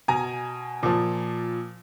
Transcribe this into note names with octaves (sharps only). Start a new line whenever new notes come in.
B2 G#5 A#5
A#2 F3